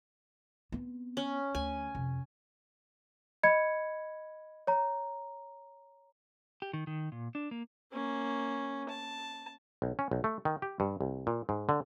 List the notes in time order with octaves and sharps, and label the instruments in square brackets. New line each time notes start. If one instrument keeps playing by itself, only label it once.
[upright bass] B3 C4
[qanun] C#4
[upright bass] D2 [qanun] G#5
[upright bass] F2 C3
[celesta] D#5 B5 G#6 C#7
C#5 A#5
[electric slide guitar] G4
D#3
D#3
A#2
D4
A#3
[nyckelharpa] A#3 C#4
A5
[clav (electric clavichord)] B1
C#4
B1
A3
D#3
G4
G2
C2
A#2
G#2
D3